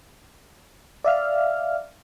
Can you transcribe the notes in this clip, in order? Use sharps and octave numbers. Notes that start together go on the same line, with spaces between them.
D5 E5 F5 F6